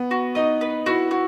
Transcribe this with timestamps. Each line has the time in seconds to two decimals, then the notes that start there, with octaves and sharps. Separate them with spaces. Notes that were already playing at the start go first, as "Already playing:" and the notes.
Already playing: B3
0.11 F#4
0.35 D#4 D#5
0.61 B4
0.86 E4 F#4
1.11 F#4